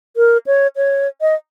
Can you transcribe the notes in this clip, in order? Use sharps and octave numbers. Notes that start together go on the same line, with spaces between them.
A#4
C#5
C#5
D#5